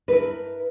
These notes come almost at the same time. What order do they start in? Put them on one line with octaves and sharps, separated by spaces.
B4 E4 A#4